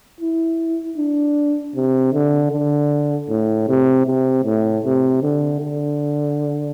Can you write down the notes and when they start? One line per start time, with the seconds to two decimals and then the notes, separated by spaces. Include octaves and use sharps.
0.20 E4
0.98 D4
1.76 C3
2.13 D3
2.52 D3
3.29 A2
3.68 C3
4.06 C3
4.44 A2
4.84 C3
5.22 D3
5.60 D3